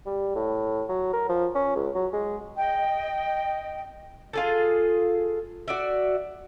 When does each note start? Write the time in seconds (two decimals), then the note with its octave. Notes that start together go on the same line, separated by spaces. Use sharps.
0.06 G3
0.35 A2
0.89 F#3
1.13 A#4
1.29 F3
1.55 C#4
1.76 C#2
1.95 F#3
2.13 G#3
2.57 D#5 G5
4.33 F4 G#4 A4
5.68 F#4 D5 E5